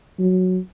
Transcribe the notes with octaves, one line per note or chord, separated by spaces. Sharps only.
F#3